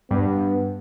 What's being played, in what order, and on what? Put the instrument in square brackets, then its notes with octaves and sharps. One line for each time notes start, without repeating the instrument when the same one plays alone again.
[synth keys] G2 [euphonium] B3